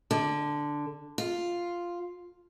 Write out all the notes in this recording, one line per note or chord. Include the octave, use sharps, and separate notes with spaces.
D3
F4